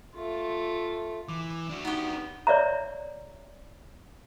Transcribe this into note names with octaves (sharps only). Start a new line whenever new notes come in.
A3 F4
E3 D6
D4 F#4
B3 D#4 G4
C#5 D5 E5 A#5